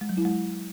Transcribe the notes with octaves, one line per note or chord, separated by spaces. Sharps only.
G#3
F#3
E4
G#3